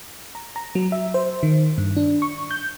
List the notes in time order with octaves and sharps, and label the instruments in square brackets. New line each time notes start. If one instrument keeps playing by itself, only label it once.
[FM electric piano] A#5
A#5
F#3
E5
C5
D#3
G2
D4
C#6
G6